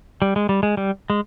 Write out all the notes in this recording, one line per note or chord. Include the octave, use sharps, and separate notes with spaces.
G3
G#3
G3
G#3
G3
G#3